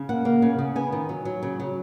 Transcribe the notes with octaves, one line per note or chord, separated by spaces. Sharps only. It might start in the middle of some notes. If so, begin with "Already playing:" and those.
Already playing: C#3
A#3 F#5
A#3
C#3
C#3
B3 G#5
D#3
F#3
F#3
C#3
F#3